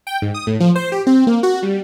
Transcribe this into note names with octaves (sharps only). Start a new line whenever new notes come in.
G5
G#2
D#6
A2
F3
C5
G4
C4
A#3
F#4
G3